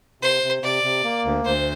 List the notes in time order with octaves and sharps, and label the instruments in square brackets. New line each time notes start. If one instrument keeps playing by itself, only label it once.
[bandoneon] C3 [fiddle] C5
[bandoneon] C3
[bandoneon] C3 [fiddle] D5
[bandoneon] C3
A#3
D2
[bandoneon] D2 [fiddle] C5